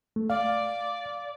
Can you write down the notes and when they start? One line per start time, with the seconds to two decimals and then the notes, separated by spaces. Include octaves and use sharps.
0.16 A3
0.30 D5 F5